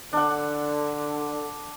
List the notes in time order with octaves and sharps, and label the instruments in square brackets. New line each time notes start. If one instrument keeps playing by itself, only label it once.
[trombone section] D3 [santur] D4 F#5